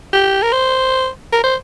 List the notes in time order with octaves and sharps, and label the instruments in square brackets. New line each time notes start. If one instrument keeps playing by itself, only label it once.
[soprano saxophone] G4
A#4
C5
A#4
C5